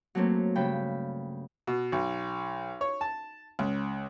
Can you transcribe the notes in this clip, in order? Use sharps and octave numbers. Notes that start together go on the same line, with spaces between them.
F#3 A3 A#3 C4 C#4
G2 C#3 G5 B5
B2
B1
C#5
A5
C#2